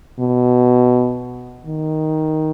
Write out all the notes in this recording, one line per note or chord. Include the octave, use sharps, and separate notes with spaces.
B2
D#3